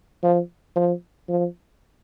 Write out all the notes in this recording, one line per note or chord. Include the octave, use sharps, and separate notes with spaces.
F3
F3
F3